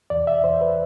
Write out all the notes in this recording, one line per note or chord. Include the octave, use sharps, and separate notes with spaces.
E2 D5
E5
E2 C5
B4